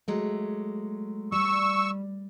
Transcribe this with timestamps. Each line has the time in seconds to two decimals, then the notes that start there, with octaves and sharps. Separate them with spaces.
0.08 F#3 G#3 A3
1.32 G3 C#6 E6